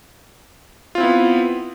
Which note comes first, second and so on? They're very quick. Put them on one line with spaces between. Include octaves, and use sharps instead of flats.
F4 C4 E4 B3